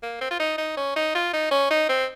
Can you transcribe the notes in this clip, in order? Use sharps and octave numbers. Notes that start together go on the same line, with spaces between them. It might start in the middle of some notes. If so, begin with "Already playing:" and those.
A#3
C4
F4
D#4
D#4
C#4
D#4
F4
D#4
C#4
D#4
C4